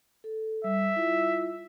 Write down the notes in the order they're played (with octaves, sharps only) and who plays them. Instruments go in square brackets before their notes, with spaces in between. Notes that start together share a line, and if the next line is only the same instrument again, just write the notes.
[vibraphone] A4
[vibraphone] G3 [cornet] E5
[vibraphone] E4 F4